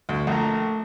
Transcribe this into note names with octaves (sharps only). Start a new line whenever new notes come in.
D2
A#1 A3 A#5